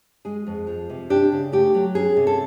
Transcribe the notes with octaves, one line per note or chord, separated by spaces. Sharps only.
G#3 G#4
F2
F3
C3
D4 G4
C#3
A3 G4
F#3
C#4 G#4
C3
A4